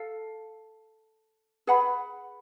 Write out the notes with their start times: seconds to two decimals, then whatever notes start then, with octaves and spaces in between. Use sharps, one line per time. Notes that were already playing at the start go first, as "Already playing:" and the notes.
Already playing: A4 F5
1.67 G#4 B4 F#5 B5